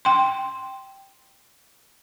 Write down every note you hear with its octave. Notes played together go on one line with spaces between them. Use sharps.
G5 C6